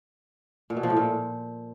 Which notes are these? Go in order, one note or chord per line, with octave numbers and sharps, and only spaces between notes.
A#2
B2
F3
A2
A#2